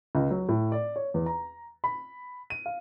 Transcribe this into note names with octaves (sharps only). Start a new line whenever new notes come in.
C#2
F#3
A2
D5
C#5
E2
A#5
B5
D#7
F5